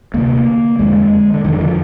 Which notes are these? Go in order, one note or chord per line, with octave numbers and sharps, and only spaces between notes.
D2 C3 A#3
F2 D3 G#3
D3
F2 D3 D#3
F3